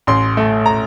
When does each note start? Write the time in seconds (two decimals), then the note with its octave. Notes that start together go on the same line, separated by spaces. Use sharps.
0.07 A1 C6
0.37 A3
0.66 A#5